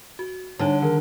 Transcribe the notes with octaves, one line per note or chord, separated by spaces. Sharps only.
F#4
D3 G3 D4 D#4 C#5
D#3 A#4